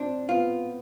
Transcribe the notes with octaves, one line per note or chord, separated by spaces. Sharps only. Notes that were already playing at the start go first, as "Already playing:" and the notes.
Already playing: C4 D4
B3 F4